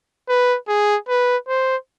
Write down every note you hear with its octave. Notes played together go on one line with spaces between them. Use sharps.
B4
G#4
B4
C5